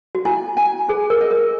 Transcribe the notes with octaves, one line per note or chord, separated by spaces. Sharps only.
F#4
E4 G#5
G#5
G#4 B4
A#4
D#5
A#4